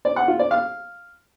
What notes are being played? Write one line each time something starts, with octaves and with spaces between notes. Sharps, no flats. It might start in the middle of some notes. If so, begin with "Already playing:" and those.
D5
F#5
F4
D5
F5